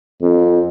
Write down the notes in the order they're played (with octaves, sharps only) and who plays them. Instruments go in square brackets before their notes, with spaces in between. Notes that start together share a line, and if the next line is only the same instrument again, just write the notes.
[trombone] F2